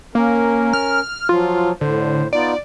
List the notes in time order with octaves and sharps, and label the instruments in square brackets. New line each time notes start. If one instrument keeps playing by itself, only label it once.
[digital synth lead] A#3 [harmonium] C#4 A#4
[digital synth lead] F6
[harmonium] F3 F#3 [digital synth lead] F4
[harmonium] A2 C5 [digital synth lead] D3
[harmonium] B3 D#4 F4 [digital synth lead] D5